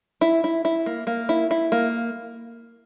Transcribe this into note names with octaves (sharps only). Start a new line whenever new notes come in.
E4
E4
E4
A#3
A#3
E4
E4
A#3